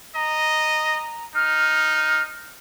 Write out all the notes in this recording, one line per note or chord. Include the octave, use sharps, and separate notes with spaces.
D#5 A#5
D#4 F6